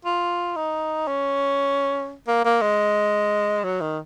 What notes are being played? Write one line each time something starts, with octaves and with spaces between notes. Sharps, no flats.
F4
D#4
C#4
A#3
A#3
G#3
F#3
D#3